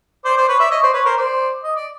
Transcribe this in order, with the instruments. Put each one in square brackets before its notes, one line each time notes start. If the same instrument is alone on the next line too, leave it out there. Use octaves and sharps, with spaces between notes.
[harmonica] C5 D5
C5 D5
B4 C#5
D5 E5
C#5 D#5
C5 D5
B4 C#5
A#4 C5
C5 D5
D#5
D5